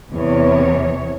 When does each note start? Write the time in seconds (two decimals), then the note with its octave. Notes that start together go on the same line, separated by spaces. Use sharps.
0.13 E2 C3 C#5